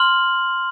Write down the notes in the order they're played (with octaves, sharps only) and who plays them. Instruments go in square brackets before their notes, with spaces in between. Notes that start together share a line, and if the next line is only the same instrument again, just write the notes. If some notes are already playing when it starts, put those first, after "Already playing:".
Already playing: [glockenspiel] C6 F6 F#7